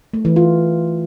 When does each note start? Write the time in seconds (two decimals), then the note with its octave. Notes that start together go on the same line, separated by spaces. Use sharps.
0.13 A3
0.25 E3
0.36 F4